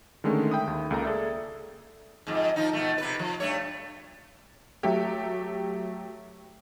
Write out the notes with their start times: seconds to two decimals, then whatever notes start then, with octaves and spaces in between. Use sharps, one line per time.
0.24 D3 D#3 G#3 A3 C#4
0.51 E5 G5 B5 D#6
0.67 D#2
0.91 C#2 A#3 A4 A#5
1.05 G#4 A4 D5 E5
2.27 F2 G#2
2.56 F3 D#4
2.73 B2 F3 A3
2.98 C3 B4
3.19 F3
3.40 G2 A3 C#5
4.83 F#3 A3 G4